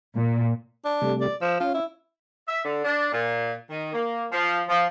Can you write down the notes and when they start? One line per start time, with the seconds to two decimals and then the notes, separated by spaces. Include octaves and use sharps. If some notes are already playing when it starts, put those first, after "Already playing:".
0.16 A#2
0.85 D4
1.02 C3 G3 A3
1.21 D5
1.41 F3 E6
1.60 C#4 F4
1.74 E4
2.48 E5
2.64 D3
2.84 D4
3.12 A#2
3.70 D#3
3.93 A#3
4.32 F3
4.68 F3